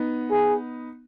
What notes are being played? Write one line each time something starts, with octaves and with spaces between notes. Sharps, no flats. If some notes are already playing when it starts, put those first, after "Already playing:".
Already playing: B3 D#4
G#4